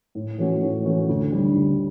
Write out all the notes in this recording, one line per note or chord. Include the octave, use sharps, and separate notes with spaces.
A2
E3 A3 C#4 F#4
A2
E3 A3 C#4 F#4
D2
D3 G3
D2